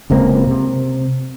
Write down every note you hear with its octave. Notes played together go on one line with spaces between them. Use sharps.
F#1 C#2 A#3 C4
C3